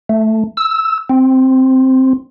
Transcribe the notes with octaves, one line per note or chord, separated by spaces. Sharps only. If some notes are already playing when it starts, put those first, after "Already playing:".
A3
E6
C4